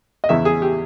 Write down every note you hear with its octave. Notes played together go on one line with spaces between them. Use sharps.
D#5
E2 C#3 E3 E5
G#4
G4